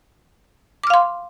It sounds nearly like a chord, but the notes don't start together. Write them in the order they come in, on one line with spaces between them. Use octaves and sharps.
D6 F6 F5 C6